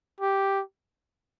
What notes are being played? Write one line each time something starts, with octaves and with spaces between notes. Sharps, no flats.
G4